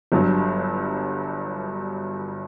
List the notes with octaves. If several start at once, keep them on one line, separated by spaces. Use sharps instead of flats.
G1 G2 F#3